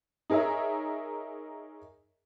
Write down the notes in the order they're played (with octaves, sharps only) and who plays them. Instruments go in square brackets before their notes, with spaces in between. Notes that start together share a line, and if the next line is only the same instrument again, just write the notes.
[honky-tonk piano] D#4 G#4 A#4 C#5 E5